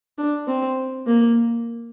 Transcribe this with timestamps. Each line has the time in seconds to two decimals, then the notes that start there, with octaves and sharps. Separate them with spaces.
0.18 D4
0.47 C4
1.07 A#3